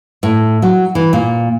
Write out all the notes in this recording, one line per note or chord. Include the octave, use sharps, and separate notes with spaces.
A2
F#3
E3
A#2